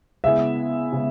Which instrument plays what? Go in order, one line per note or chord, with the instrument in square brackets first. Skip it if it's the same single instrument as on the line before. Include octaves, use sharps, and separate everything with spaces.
[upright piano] C#3 G#3 B3 E4 [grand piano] E5
[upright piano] C#3 G#3 B3